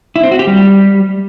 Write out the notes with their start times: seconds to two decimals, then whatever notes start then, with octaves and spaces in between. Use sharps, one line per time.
0.16 E4
0.23 C4
0.31 F#4
0.39 G4
0.47 G3